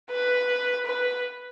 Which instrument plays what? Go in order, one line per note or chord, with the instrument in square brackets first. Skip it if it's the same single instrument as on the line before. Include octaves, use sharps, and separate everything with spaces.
[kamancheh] B4
B4